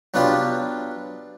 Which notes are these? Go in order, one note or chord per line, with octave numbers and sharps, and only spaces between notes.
F#3 B3 D4 F4 G4